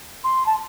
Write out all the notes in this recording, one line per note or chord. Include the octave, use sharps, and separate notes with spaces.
C6
A5